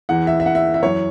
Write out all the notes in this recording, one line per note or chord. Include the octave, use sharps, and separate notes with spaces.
E2 E3 F#5
E5
E5
F#5
E5
E5
F#2 E3 C#5